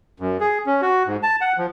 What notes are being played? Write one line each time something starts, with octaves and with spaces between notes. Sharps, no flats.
F#2
G#4
C#4
F#4
G#2
A5
F#5
F3